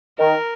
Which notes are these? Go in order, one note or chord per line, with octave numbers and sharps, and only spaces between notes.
D#3 A#4